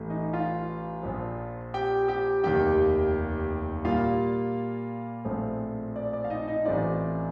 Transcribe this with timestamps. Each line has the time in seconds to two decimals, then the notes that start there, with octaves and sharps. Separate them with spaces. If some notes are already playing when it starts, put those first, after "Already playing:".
Already playing: A1 A2 A3
0.10 D#4 D#5
0.33 F4 F5
1.03 A#1 A#2 F3
1.74 G4 G5
2.08 G4 G5
2.44 F1 D#2 D#3 G4 G5
3.84 A#2 G3 A#3 F4 F5
5.25 A#1 A2 F3 A3 C4
5.96 D5
6.13 D5
6.24 F5
6.30 D#4 D#5
6.47 D#4 D#5
6.65 A1 A2 A3 C4 F4 D5